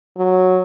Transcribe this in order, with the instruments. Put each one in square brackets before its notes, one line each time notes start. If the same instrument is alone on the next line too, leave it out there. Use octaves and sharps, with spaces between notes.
[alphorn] F#3